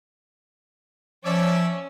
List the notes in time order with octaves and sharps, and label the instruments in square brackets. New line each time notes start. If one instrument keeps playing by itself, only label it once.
[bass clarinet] F3 [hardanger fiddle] C#4 [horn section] C#5 D5 E5